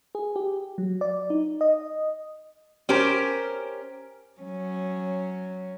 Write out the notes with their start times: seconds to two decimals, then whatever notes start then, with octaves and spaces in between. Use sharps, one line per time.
0.15 G#4
0.36 G4
0.78 F#3
1.01 D5
1.30 D#4
1.61 D#5
2.89 C#4 G4 A#4 C5
4.41 F#3 C#4